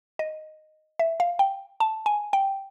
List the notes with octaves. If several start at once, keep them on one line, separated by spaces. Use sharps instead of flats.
D#5
E5
F5
G5
A5
G#5
G5